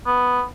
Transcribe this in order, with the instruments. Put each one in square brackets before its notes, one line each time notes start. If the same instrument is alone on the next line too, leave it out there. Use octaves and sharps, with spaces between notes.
[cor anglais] B3